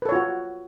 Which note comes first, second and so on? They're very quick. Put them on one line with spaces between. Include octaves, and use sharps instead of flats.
B4 A4 C#5 F4 F#4